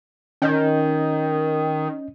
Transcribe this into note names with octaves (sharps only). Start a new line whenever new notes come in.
D#3 C#4 D#5 G6